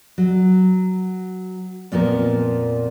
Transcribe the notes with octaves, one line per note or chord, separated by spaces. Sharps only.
F#3
F2 A#2 F3 B3 A#4